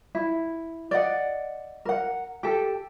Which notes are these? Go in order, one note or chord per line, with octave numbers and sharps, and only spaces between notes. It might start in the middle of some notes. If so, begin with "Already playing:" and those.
E4
D5 D#5 F#5
A#4 F#5
G4 A4